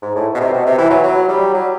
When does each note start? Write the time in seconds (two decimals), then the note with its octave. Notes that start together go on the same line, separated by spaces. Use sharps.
0.02 G#2
0.16 A2
0.35 B2
0.40 C3
0.53 B2
0.66 C3
0.78 E3
0.90 F#3
1.03 F#3
1.29 G3
1.54 F#3